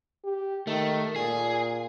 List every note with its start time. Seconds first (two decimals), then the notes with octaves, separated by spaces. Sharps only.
0.24 G4
0.67 D#3 A3
1.16 A#2 G#4